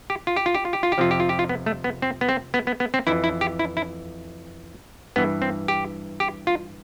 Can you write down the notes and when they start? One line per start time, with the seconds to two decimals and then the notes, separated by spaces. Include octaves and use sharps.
0.10 G4
0.27 F4
0.36 G4
0.46 F4
0.55 G4
0.65 F4
0.73 G4
0.83 F4
0.92 G4
0.98 F2 C3 F3 F4
1.11 G4
1.20 F4
1.29 G4
1.39 F4
1.49 B3
1.66 A3
1.84 B3
2.02 C4
2.21 B3
2.29 C4
2.54 B3
2.67 B3
2.80 B3
2.94 C4
3.07 F2 E3 E4
3.24 E4
3.41 G4
3.59 E4
3.77 E4
5.16 G2 E3 B3
5.42 C4
5.68 G4
6.20 G4
6.47 F4